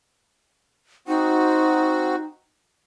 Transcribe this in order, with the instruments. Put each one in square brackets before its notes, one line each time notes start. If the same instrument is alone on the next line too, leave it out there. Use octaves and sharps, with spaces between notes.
[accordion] C4 F#4 [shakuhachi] D#4